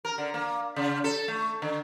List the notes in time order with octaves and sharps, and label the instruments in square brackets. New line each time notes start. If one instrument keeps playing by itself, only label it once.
[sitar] A#4
D3
A#3
C#3
A4
A3
D3